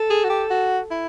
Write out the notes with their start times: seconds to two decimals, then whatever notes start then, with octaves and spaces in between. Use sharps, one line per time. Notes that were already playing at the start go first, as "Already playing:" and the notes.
Already playing: A4
0.10 G#4
0.24 F#4
0.30 G4
0.50 F#4
0.91 E4